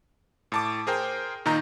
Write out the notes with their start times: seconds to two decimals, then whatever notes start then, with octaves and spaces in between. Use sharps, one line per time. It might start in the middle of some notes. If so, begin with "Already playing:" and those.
0.52 A2 A5 D6
0.87 G#4 A#4 C5 G5
1.45 A#2 D#3 D#4 A#5